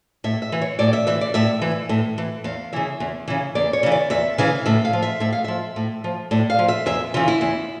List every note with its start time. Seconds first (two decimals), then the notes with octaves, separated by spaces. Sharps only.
0.24 A2 E5
0.42 E5
0.52 E3
0.61 C#5
0.79 A2 D5
0.93 E5
1.07 E3 E5
1.21 D5
1.34 A2 E5
1.61 E3
1.89 A2
2.18 E3
2.44 E2 F5
2.73 C#3 E3 E5
3.00 E2
3.28 C#3 E3
3.55 E2 D5
3.73 C#5
3.83 C#3 E3
3.92 D5
4.10 E2 E5
4.38 C#3 E3 F5
4.66 A2 E5
4.85 F5
4.93 F3
5.02 E5
5.20 A2 E5
5.32 F5
5.44 F3 E5
5.76 A2
6.04 F3
6.31 A2 D5
6.50 F5
6.59 F3
6.68 E5
6.86 E2 E5
7.14 C#3 E3 F4
7.28 E4
7.41 E2